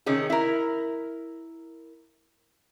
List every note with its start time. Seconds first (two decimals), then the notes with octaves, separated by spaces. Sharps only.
0.06 C3 D#3 C#4 G#4
0.30 E4 A#4